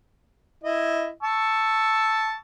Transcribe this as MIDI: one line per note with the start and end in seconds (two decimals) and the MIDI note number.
0.64 1.09 64
0.64 1.09 75
1.23 2.36 81
1.23 2.36 85
1.23 2.36 88